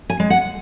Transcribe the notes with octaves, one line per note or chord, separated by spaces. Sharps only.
G#5
G#3
F#5